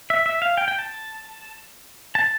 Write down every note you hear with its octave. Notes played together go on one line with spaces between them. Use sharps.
E5
E5
F5
G5
G5
A5
A5